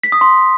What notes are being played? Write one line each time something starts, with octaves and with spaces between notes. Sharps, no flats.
B6
D#6
C6